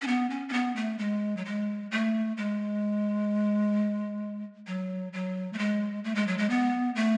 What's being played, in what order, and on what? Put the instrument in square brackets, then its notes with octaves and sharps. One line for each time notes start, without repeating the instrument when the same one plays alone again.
[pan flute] C#4
B3
C#4
C#4
B3
A3
G#3
F#3
G#3
A3
G#3
F#3
F#3
A3
G#3
A3
G#3
F#3
G#3
B3
A3